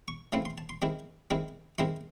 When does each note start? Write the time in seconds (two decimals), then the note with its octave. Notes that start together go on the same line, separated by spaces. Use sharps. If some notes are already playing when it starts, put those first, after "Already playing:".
0.08 C#6
0.32 C#3 E3 A3 C4 E4 C6
0.45 C6
0.58 A5
0.69 C6
0.82 D#3 G#3 C4 E4
1.31 D#3 G#3 C4 E4
1.78 D#3 G#3 C4 E4 C6